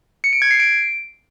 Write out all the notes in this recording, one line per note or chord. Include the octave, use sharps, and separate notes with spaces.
C#7
D7
G#6
C7
D7